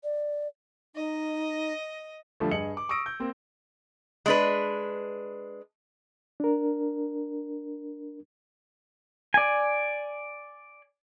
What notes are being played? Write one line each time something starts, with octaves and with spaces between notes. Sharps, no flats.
D5
D#4 D#5
D3 F3 G3 A3
G2 G#4 D#5 C#7 F#7
D6
C#6 D#6 E6 A#6 D7
G6
A#3 C4
G#3 D4 B4
D4 A#4
D5 G#5